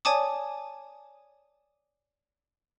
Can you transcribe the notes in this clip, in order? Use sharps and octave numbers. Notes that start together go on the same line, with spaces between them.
C#5 D5 G#5 A5 D6 D#6